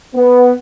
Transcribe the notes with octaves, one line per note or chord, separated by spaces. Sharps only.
B3